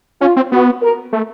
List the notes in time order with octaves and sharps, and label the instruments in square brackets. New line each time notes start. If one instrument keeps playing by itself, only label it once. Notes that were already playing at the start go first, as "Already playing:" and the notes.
[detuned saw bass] C#4 [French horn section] F4
[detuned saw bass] C4
[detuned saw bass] B3 [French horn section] F#4
[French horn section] A#4
[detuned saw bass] A3